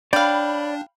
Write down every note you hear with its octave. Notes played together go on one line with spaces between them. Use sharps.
D4 C#5 D5 F5 G5 B5